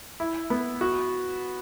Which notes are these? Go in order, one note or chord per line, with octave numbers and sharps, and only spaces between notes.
E4
B3
F#4